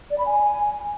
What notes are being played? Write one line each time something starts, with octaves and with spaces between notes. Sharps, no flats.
D5
B5
G#5